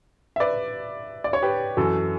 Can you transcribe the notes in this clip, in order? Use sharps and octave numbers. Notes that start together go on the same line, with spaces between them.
E5
B4 D5
D5
C#5
G4 B4
F#2 E3 F#4 A4